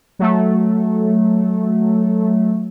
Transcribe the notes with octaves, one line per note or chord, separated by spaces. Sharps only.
F#3 A3